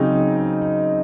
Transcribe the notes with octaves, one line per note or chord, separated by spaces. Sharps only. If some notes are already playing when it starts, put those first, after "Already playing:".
Already playing: C#3 F#3 C4 D#4